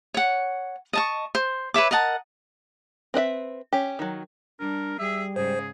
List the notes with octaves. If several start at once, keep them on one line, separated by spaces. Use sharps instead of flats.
C#5 F#5
D#5 A5 C#6
C5
B4 C#5 E5 D6
A#4 D#5 F#5 A5
C4 B4 D#5 E5
C#4 G4
D#3 F#3
G3 D4 A#4
G3 G#4 E5
G#2 C#3 G#4 C5